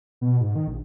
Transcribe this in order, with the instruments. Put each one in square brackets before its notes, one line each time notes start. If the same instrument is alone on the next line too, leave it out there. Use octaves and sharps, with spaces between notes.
[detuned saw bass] B2
G#2
D#3
A#1